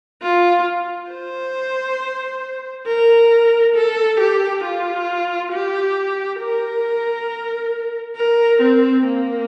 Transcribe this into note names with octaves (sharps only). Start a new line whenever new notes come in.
F4
C5
A#4
A4
G4
F4
G4
A#4
A#4
C4
A#3